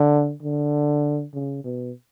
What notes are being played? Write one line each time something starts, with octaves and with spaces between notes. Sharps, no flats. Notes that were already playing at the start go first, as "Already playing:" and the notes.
Already playing: D3
D3
C#3
B2